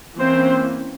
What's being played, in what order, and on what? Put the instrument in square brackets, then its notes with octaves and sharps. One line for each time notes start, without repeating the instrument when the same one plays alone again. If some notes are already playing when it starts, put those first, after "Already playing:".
[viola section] E3 A#3 C4 C#4 C5